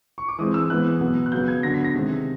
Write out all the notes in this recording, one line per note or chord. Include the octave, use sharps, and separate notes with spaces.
C#6
D6
E3 G#3 C4 D#6
E6
E3 G#3 B3 F#6
B2 F#3 B3
F#6
C#3 F#3 B3 G6
G#6
D3 F#3 B3 A#6
B6
A#6
C3 D#3 G#3 C4